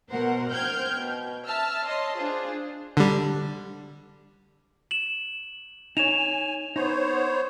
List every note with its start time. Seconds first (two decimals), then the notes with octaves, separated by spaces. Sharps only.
0.11 B2 A#4 C5 F#5
0.52 C5 G5 F6 G6 G#6
0.97 B2
1.46 E5 A5 E6 F6
1.85 C#5 D#5 A5 C6
2.15 D4 F4 G#4 C5
2.97 D3 G3
4.91 E7 F#7
5.97 D#4 C#5 G#5 E7 F7
6.76 B3 D#4 C5 C#5